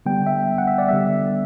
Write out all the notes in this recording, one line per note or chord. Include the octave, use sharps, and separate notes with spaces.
D3 G3 B3 G5
E5
F#5
E5
D5
D3 G3 B3 E5